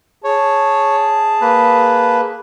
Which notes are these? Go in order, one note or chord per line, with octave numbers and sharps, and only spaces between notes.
G#4 C#5 A5
A#3 B4